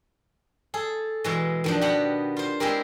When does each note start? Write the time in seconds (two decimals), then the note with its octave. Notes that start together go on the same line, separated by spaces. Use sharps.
0.74 G#4 A4
1.24 B2 E3 G#3
1.64 D#3 F3 D4
1.81 B2 B3 G4 F#5
2.37 F4 C5
2.60 G#3 C4 E4 G4 A#4